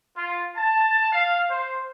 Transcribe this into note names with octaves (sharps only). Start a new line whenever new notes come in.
F4
A5
F5
C5